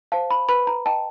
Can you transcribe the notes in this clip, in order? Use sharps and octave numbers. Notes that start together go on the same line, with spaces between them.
C5 F5 A5
B5
B4 B5
A#5
D#5 G5 A5